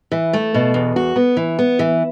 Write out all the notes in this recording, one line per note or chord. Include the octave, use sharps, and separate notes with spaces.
E3
A3
B2
E2
F#4
B3
E3
B3
E3